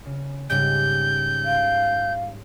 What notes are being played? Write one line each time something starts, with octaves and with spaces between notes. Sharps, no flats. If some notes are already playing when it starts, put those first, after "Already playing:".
C#3
G#2 C#3 G3 G6
F5 D7